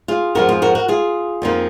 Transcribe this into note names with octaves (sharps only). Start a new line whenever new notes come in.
F4 G#4
F2 F3 G#3 F#4 A#4
F4 G#4
F#4 A#4
F#4 A#4
F4 G#4
F2 F3 A#3 D#4